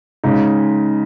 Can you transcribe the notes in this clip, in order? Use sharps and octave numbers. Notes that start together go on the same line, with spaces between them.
C#3 G#3 D#4